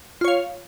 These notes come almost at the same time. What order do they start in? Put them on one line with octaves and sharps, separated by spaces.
F4 C#5 F5